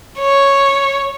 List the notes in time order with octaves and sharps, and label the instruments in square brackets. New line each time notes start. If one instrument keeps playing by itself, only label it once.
[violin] C#5